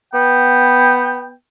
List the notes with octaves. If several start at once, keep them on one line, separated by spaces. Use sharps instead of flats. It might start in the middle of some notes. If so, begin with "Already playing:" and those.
B3 G5